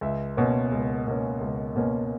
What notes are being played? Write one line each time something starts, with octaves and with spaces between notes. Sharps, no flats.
C#2 E5
B2 A#3 C#4
C#2
B2 A#3 C#4
C#2
B2 A#3 C#4